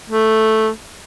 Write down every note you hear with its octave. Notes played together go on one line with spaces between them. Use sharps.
A3